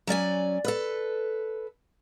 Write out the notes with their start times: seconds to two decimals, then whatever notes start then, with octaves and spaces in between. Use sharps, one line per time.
0.07 F#3 C#4 D5 G#5
0.64 A4 B4